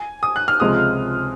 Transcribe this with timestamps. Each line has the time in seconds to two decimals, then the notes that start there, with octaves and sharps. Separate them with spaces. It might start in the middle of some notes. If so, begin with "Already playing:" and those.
Already playing: G#5
0.23 D#6
0.36 F#6
0.48 F6
0.60 C#2 C3 F3 G#3 D#6